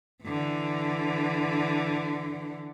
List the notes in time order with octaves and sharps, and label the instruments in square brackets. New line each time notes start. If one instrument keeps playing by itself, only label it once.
[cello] D3 E3